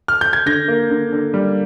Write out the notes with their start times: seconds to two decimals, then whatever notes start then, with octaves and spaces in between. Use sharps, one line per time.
0.08 F6
0.21 G6
0.33 G#6
0.46 D3 G6 A#6
0.68 A#3
0.90 D3
1.12 D3
1.34 G3